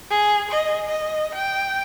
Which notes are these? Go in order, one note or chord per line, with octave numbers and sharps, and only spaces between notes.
G#4
D#5
D#5
G5